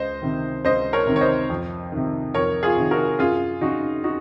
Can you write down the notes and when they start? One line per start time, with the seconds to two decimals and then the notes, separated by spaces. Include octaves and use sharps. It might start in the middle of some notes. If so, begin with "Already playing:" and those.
Already playing: C#2 C5 D#5
0.22 C3 D#3
0.65 C#2 C5 D#5
0.93 A#4 C#5
1.07 C3 D#3
1.16 C#5
1.21 C5 D#5
1.50 F2
1.92 C3 D#3
2.34 F2 A#4 C#5
2.63 F4 G#4
2.77 C3 D#3
2.91 F#4 A#4
3.19 F#2 F4 G#4
3.61 C#3 D#4 F#4
4.04 D#4 F#4